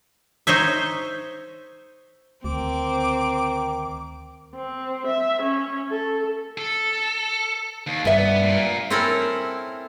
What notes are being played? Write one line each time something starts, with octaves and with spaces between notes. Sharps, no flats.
D#4 C5 C#5 E5
D2 D#3 C4 D6
C4
E5
C#4
A4
A4
D#2
G2 B3 E5
A#2
C4 C#4 E4 A4 A#4